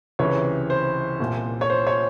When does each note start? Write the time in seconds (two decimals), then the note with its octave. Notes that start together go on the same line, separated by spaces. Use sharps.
0.19 C#2 C3 E3 C#5
0.70 C5
1.20 C2 A#2
1.61 C#5
1.70 C5
1.87 C#5